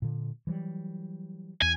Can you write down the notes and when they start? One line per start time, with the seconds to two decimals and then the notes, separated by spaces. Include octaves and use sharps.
0.02 A#2 D3
0.47 E3 F#3 G3
1.62 E2 G#5